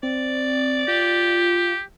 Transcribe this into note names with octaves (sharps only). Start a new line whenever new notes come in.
C4 D5
F4 G4